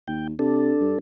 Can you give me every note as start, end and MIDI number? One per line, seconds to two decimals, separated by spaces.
0.08 0.33 39
0.08 0.27 79
0.39 0.73 48
0.39 0.99 62
0.39 0.99 69
0.81 0.96 43